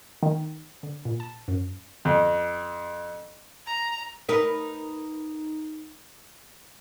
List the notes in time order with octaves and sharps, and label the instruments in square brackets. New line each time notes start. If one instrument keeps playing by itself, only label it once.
[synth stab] D#3
[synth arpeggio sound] D3
A#2
A5
F#2
[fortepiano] F2
[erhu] A#5
[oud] D#4 A#4 B4